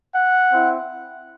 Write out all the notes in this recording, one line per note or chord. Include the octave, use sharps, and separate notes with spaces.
F#5
C4 E4